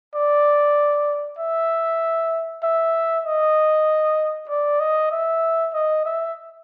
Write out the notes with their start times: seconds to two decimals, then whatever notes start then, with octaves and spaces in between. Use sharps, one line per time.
0.15 D5
1.39 E5
2.63 E5
3.25 D#5
4.49 D5
4.80 D#5
5.12 E5
5.73 D#5
6.05 E5